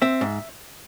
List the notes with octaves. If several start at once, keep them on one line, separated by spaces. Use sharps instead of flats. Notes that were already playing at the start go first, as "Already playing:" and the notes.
C4 E5
G#2